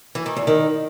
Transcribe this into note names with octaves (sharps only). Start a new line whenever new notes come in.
E3
D#3
E2
D#3